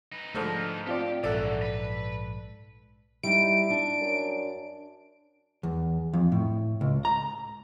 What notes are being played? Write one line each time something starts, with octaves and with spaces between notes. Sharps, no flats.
D#4 B4
G#2 D3 F3 A3
C4 F4 G4 D5 G5
A#1 G#2 E3 F#3 A4 D5 E5 F#5
B4
G3 D#4 E4 D7
D4
F#2
E2
F2
A2
C#2
A#5